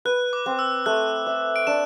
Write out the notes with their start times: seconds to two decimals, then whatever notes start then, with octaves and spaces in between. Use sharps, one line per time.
0.05 B4 F#6
0.33 D6
0.46 C4
0.59 E6
0.86 A3 F#6
1.27 E5
1.56 D7
1.67 D4 E7